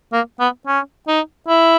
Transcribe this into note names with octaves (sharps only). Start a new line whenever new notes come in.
A#3
B3
C#4
D#4
E4